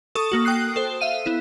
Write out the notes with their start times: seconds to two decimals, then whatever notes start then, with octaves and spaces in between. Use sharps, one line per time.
0.15 A4 C#6 D#6
0.32 A#3 F#4
0.45 G5 D#6 F#6 C7
0.76 A4 C5
1.01 E5 F5 D#7
1.26 B3 E4